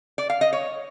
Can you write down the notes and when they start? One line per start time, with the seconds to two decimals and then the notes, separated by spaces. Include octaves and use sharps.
0.18 D5
0.30 F5
0.41 D#5
0.53 C#5